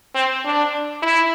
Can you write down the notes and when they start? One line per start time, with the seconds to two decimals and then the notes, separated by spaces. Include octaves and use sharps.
0.15 C4
0.45 D4
1.02 E4